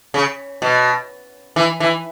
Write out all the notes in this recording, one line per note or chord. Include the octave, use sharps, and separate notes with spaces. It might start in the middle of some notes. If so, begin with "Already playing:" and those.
C#3
B2
E3
E3